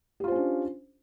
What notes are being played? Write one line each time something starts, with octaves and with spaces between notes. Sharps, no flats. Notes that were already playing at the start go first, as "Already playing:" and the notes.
C#4 D4 F4 G4 C5